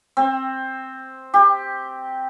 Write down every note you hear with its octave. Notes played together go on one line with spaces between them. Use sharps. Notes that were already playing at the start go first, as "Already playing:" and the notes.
C4
G4